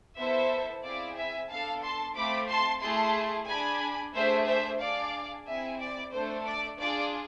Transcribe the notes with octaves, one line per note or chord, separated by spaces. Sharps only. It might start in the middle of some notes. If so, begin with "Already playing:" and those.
B3 E4 A4 C5 E5
C4 E4 G#4 D5 F5
E5 G#5
B3 D4 A4 F5 A5
A5 C6
A3 C4 F4 B5 D6
A5 C6
A3 E4 G#4 A5 C6
D4 G#4 G#5 B5
A3 D4 G#4 C5 E5
C5 E5
D4 G#4 D5 F5
C4 E4 G#4 E5 G#5
D5
A3 D4 A4 C5
D5
D4 F4 G#4 D5